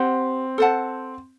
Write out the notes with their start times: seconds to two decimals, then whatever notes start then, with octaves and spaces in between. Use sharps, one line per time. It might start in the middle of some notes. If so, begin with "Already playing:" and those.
Already playing: C4 G4 C5 F#5
0.58 A4 C5 F#5 A5